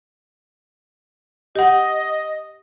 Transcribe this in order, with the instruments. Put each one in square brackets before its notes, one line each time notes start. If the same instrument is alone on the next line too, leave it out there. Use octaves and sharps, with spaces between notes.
[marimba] G4 F#5 [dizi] D#5